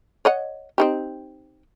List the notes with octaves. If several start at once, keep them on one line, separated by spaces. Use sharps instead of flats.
C#5 D#5 F#5
C4 D#4 G4